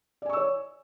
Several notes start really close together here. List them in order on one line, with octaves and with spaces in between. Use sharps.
D5 G#5 C#6 E6 C#5